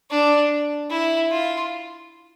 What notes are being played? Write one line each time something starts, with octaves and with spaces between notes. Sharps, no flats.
D4
E4
F4